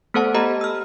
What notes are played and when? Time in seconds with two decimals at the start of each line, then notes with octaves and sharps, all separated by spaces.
0.14 A3 B3 A4 C5 F#5 A5
0.34 G4 A4 D#5 A#5 B5
0.61 E6 F6